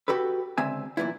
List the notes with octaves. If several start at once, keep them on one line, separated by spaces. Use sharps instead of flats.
F#4 G4 A4 B4
C#2 D3 C4 E5 G#5
B1 A#2 E3 E4